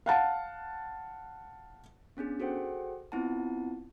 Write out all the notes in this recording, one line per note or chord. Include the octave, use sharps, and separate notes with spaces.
F5 F#5 A5
B3 C#4 D4 G#4
F#4 G#4 A4 C5 F#5 G5
B3 C4 E4 F4 F#5 A5